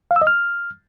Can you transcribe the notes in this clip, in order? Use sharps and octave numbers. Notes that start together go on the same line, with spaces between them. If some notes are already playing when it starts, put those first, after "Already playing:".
F5
E6
D#5
F6